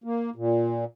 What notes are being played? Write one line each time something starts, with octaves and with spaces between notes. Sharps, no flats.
A#3
A#2